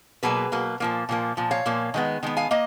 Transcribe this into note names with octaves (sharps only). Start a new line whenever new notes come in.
B2 F#3 A#3 G#4 B4
B2 F#3 A#3
A#2 F3 A#3
A#2 F3 A#3
A#2 F3
C#5 F5
A#2 F3 A#3
D#3 G#3 B3
D#3 G#3 B3
F5 G#5
A#3 D#5